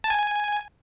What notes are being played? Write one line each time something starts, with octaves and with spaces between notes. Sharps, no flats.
A5
G#5